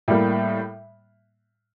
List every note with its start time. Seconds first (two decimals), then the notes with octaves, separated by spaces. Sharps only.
0.08 A2 G3 A#3